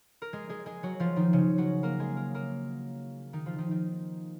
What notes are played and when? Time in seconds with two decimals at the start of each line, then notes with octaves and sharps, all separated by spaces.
0.22 A#4
0.33 G#3 G#4
0.49 G#3 G#4
0.66 G#3 G#4
0.83 F#3 F#4
1.00 F3 F4
1.16 D#3 D#4
1.33 C#3 C#4
1.58 F#3 F#4
1.83 A#3 A#4
1.99 G#3 G#4
2.17 A#4
2.34 A#3 A#4
3.33 D#3 D#4
3.46 F3 F4
3.58 D#3 D#4
3.71 D#3 D#4